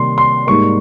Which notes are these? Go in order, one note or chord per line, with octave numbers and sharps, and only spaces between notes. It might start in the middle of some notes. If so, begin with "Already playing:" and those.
Already playing: C3 D#3 G3 A#3 C6
C6
G#2 G3 A#3 C#6